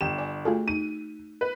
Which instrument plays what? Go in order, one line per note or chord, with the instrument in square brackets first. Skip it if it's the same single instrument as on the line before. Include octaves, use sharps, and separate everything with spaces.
[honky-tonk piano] G1 E7 [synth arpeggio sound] G4 G5
[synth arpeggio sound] D5 [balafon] G#5
[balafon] A3 F#4 [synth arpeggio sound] F4 G#4 A4
[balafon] D#4 [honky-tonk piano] D#7
[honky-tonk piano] B4